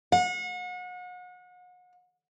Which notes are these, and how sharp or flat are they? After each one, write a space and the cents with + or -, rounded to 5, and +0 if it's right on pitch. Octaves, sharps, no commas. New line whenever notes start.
F#5 -35